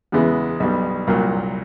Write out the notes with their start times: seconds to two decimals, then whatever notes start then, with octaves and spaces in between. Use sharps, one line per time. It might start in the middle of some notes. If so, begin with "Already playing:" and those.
0.12 E2 C#3 E3 G#3 B3
0.60 B1 B2 G3 B3
1.07 C2 A#2 F#3 A#3